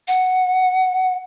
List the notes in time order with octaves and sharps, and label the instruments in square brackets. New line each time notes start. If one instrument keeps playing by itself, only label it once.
[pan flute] F#5